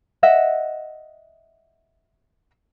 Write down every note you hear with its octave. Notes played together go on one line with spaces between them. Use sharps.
D#5 E5 F#5